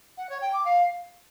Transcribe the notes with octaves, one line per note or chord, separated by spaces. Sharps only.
F#5
C#5
G5
D6
F5